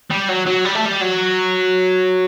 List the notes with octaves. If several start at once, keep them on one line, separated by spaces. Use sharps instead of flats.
G3
F#3
F#3
G3
A3
G3
F#3